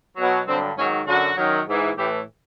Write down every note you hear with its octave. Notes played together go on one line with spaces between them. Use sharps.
B2 F#3
G2 D3 F#3 C4
G#2 D#3 F#3 C#4
F#2 D3 F#3 F#4
F#2 D#3 F#3
G#2 E3
A2 E3 G4